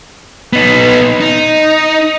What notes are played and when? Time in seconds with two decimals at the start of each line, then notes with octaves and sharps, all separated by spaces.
0.53 B3 D#4
1.21 D#4